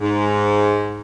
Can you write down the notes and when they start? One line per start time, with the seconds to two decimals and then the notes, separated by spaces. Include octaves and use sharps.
0.01 G#2